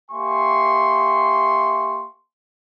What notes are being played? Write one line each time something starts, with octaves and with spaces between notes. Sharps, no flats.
A#3 G4 E5 G#5 C6 C#6